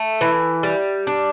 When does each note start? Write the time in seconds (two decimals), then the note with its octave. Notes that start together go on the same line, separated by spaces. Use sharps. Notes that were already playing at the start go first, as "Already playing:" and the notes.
Already playing: A3
0.21 E3
0.63 G3
1.07 D4